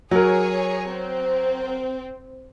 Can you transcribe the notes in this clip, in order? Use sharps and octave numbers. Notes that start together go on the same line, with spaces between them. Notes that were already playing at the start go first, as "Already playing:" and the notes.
F#3 G#4 A#4 C#5
C4